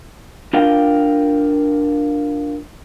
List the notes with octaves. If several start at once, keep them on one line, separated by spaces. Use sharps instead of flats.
D4 F4 A#4 F5 G5